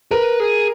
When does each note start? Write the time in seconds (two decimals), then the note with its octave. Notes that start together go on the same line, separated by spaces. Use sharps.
0.11 A#4 B4
0.40 G#4